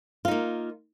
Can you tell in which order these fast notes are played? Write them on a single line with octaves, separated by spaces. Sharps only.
F4 D#4 A#3